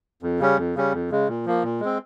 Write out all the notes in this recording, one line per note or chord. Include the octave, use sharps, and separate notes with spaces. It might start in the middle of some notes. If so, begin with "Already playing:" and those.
F2
C#3 G3 C#4
F2
C#3 G3 C#4
F2
C#3 G#3
A#2
F3 A#3
A#2
G#3 C4